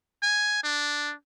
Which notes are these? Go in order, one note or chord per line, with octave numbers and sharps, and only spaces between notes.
G#5
D4